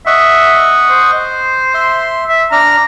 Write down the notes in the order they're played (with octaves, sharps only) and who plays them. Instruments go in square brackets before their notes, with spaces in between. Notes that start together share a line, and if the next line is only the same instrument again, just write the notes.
[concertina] D#5 F#5 C#6 [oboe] E5
[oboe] C5
[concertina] E5 C6
[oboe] E5
[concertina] D4 F6 [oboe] A#5